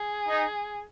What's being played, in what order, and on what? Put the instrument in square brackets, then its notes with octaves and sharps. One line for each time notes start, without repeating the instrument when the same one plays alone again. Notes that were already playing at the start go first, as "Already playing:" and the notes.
Already playing: [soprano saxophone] G#4
[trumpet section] D#4